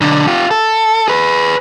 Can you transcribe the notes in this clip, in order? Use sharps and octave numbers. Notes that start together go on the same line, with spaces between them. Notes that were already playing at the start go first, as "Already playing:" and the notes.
B1 D3
F4 G4
A4
G#4 B4